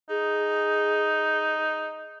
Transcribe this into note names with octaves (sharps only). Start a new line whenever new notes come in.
D#4 G#4